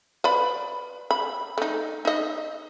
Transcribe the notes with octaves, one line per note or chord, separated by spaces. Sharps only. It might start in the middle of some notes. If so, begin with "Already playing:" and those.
B4 D5 B5
B5
A3 D#4
D#4 D#5